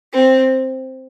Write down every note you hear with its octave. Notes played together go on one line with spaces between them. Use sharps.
C4